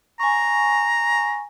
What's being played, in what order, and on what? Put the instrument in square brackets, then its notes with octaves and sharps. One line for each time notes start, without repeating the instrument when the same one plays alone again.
[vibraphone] G#5 C#6 [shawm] A#5